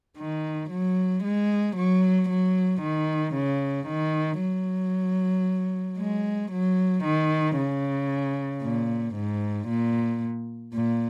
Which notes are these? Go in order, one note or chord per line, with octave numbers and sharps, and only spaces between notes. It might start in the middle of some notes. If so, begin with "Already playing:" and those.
D#3
F#3
G#3
F#3
F#3
D#3
C#3
D#3
F#3
G#3
F#3
D#3
C#3
A#2
G#2
A#2
A#2